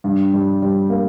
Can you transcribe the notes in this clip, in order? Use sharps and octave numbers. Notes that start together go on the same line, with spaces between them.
G2
G3
G3
A#3